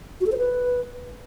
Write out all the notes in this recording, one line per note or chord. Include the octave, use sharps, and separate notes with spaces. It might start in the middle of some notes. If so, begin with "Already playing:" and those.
F#4
A4
C5
B4